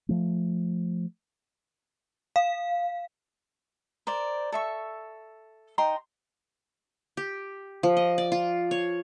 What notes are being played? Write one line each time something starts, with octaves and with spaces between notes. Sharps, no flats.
F3 A3
F5
A#4 C5 D5
A4 E5 C#6
D#4 G5 A#5 C6
G4
F3
D#5
D5
F4
C#5